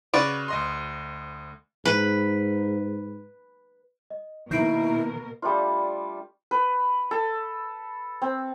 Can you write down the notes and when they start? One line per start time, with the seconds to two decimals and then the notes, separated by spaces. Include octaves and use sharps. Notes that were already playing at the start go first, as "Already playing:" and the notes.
0.14 C#3 F#4 B4 D5
0.48 D2 D#5 C6
1.85 G#2 B4
4.10 D#5
4.51 B2 D#3 A#3 E4 A#4 G6 C7 D7
5.42 G3 A3 D4 F4
6.51 B4
7.11 A4
8.22 C4